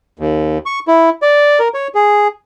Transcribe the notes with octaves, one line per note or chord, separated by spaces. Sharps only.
D#2
C#6
E4
D5
A#4
C#5
G#4